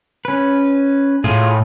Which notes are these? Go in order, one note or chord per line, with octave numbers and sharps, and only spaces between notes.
C#4 B4
A2 F4 G#4